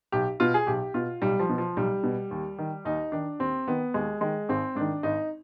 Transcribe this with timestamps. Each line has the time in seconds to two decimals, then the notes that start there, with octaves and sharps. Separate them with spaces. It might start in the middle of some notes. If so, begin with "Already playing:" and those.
0.12 B1 G4
0.40 B2 F4
0.54 G#4
0.67 B1 G4
0.94 B2 F4
1.22 B1 G3
1.39 F3
1.49 B2
1.58 F3
1.76 B1 G3
2.03 B2
2.31 D#2
2.59 D#3
2.85 D#2 D#4
3.12 D#3 D4
3.39 D#2 C4
3.68 D#3 B3
3.94 D#2 G#3
4.21 D#3 G#3
4.49 G#1 C4
4.75 G#2 D#3 D4
5.03 G#1 D#4